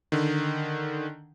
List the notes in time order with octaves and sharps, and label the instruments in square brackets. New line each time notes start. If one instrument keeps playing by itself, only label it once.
[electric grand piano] D3 D#3